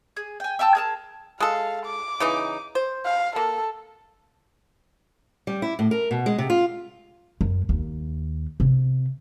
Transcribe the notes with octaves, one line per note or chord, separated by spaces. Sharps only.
G#4
G5 G#5
E5 G5 A5 E6
G#4 A#4 A5
G#3 A4 F5
D6
C#3 E3 D#4
C5
F5
A#3 A4
G3
E4
A2
A#4
B2
G#3
C3
F4
F#2
D#2
C3